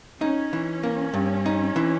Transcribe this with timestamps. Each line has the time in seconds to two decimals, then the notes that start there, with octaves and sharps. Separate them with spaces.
0.21 C#4 D#4
0.53 E3
0.83 A#3
1.14 G2
1.46 D#4
1.76 E3